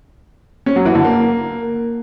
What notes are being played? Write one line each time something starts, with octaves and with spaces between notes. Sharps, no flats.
C#4
F#3
E3
D3
A#3